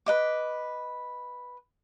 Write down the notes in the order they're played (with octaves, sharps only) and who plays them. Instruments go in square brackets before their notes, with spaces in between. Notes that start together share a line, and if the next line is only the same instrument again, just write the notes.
[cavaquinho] B4 D#5 D6